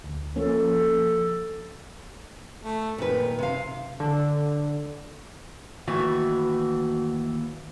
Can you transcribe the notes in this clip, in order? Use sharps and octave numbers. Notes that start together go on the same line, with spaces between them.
D2
F3 A#3 C#4 A4
A3
A#2 D#3 B4
C3 F5
D3
D#2 E3 A3 F#4